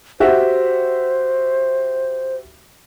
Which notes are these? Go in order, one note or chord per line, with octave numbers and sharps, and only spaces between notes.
F#4 G4 C5 E5